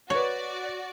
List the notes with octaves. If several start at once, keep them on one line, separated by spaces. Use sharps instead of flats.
F#4 B4 C#5 D5 C#6